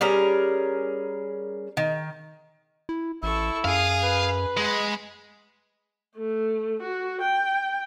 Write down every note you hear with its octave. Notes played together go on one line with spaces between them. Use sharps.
G3 C#4 G#4 A#4
D#3
E4
A1 E4 A4 C#6
F#2 G#4 F5 D#6
B4
G#3 F#5 B5
A3
F#4
G5